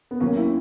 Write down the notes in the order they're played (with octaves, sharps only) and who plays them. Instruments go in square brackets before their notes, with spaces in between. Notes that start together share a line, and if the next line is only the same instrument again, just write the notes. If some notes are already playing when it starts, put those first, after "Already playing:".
[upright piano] B3
D#2 D#3 F#3 A#3 C#4
C#4 E4